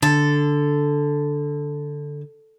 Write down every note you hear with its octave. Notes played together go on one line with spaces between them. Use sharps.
D3 A4